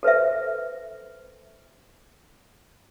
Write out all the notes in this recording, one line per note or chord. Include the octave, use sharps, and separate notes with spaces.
A4 B4 C5 E5